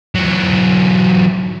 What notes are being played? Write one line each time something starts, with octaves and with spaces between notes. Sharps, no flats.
E3 F#3